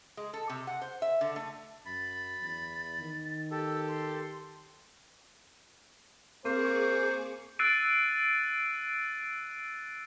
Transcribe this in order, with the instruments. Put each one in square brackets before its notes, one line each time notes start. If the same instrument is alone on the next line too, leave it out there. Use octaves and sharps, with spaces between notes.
[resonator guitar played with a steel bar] G#3
A4
C3
F#5
C5
E5
D3
A3
[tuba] F#2 [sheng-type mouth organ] B5 [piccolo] A6
[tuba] E2
D#3
[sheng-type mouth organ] G4 A4 [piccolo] E6
[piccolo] C6
[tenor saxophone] A#3 [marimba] C4 [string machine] G#4 C#6 D6 [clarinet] C5
[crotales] E6 F#6 A6 C7 D7 D#7